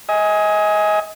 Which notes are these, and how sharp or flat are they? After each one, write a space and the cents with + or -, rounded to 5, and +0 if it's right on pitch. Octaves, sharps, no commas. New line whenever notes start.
D#5 +30 G#5 +0